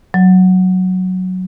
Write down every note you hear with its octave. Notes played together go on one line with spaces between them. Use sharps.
F#3